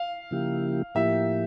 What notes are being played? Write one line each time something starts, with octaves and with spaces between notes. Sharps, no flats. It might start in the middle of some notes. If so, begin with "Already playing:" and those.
Already playing: F5
C#3 F3 A#3 E4 G4
A2 F3 A#3 E4 G4 E5